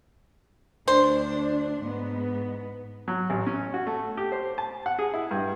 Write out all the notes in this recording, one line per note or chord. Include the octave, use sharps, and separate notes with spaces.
D2 D4 C5
G#2 B3
F#3
A1
C#4
F#4
A3
G4
C5
A5
F#5
G#4
E4
G2